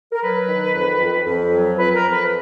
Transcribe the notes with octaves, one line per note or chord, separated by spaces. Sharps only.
A#4
F#3 B4
D#3
F2
F2
F2
F#3
F2 B4
A#4
F2
B4